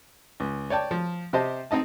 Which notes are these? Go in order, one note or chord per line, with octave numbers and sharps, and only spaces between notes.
C#2
C#5 D5 G5 A5
F3
C3 G4 C5 D#5 A5
C4 D#4 D#5 A5